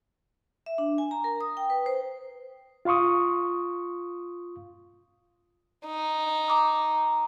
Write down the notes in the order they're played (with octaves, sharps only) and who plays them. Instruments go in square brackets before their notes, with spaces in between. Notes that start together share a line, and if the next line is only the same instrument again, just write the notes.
[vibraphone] E5
D4
G#5
A#5
A#4
D#6
G5
B4
C5
[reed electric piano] F4 F5 C6 C#6 D#6
[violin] D#4
[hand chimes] A#5 D6 D#6